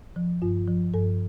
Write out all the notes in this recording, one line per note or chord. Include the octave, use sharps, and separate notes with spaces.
F3
G2 F4
F3
G2 A4